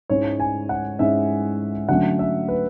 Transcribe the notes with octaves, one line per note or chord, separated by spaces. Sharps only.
G#2 G#3 C#4 E4 C#5
G#5
F#5
G#2 G#3 C#4 E4 E5
D3 F#3 A3 C#4 F#5
E5
B4